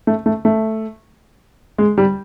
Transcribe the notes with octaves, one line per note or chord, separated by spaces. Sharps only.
A3
A3
A3
G#3
G3